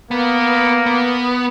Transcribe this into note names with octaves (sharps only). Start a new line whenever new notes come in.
A#3 B3
B3